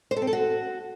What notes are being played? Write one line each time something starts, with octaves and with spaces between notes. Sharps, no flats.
C5
A4
C4
A4
F#4